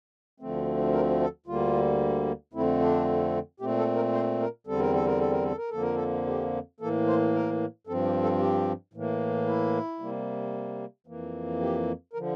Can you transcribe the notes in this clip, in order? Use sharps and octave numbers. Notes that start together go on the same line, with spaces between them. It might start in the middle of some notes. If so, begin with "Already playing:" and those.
D2 D3 F3 A3 C4
A#4
A4
D2 D3 G3 A#3 F4
F2 D3 A3 C4 E4
D4
A#2 A3 C4 G4
A4
A#4
C5
A#4
E2 D3 G3 C4 A4
A#4
A4
A#4
A4
A#4
A4
A#4
F2 D3 F3 A#3 A4
A#4
A4
G4
A2 E3 A#3 A4
C5
A#4
G2 F3 C4 A4
G4
A4
G4
A2 E3 A#3
E4
C3 G3 A#3
F2 E3 A#3
G4
A#4
D3 F3